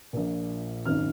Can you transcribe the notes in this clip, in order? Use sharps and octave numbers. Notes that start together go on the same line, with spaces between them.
A#1 A#2
G#1 F#2 D#3 F6